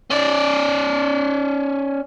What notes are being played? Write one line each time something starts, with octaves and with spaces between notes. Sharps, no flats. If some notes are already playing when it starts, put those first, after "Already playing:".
C#4 D5